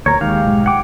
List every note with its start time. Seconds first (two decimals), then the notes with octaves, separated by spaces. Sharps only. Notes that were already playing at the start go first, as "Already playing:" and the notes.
0.06 D2 A#2 A#4 C#5 A#5
0.21 D#2 D#3 G#3 G4 F5
0.44 B1 G#2
0.66 F#5 G5 D6